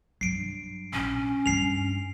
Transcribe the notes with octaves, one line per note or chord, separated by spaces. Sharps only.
G2 F#3 C7 D7
A#1 C#4
G2 D3 C7 F7